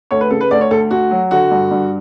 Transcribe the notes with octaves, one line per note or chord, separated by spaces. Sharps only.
D2 C#5
B4
C#3 A4
B4
D2 D5
C#5
D2 A4
D2 F#4
F#3
D3 F#4
G2
G2